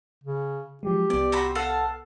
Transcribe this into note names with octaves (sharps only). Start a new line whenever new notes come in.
C#3
F3 F#3 G#3 G4
C2 B3 D5
C4 F#4 B5
A4 F5 F#5